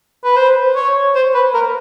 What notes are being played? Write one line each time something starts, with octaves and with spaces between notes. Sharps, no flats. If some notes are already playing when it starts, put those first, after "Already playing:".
B4
C5
C#5
C5
B4
A#4